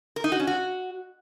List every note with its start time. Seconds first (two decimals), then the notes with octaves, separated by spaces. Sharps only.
0.16 A#4
0.24 D#4
0.32 F#4
0.40 C#4
0.47 F#4